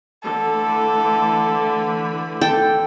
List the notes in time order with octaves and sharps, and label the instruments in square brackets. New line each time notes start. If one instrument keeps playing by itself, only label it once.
[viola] D3 [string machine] E3 A3 B5 [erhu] A4
[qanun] A4 G5